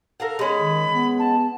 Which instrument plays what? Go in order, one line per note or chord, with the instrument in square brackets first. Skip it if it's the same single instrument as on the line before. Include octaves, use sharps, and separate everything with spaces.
[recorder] A4 [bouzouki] A#4 F5 F#5
[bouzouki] G#3 C#4 [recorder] B5
[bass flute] D#3
B3
[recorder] A5